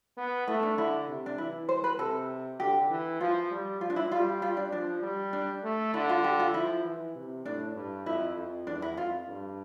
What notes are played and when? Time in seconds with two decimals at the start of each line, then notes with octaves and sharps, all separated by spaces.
0.17 B3
0.47 A3 E4
0.63 D4
0.77 D3 E4
1.08 C3
1.26 D4
1.38 E3 E4
1.69 C5
1.84 B4
1.99 C3 A4
2.60 D3 G4
2.90 E3
3.21 F3 F4
3.51 G3
3.81 F3 F4
3.90 D4
3.96 E4
4.12 G3 F4
4.42 F4
4.57 D4
4.72 F3 D4
5.03 G3
5.33 D4
5.63 A3
5.94 D3 E4
6.09 F4
6.24 G4
6.40 F4
6.54 F3 E4
6.85 E3
7.16 C3
7.46 A2 D4
7.76 G2
8.06 F2 E4
8.37 F2
8.67 E2 D4
8.82 E4
8.97 F2 F4
9.28 G2